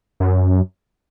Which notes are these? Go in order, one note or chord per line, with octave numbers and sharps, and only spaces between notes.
F#2